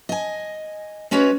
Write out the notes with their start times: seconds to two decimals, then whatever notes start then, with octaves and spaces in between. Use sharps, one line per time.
0.09 D#5 G#5
1.11 G#3 C#4 F#4 B4 C#5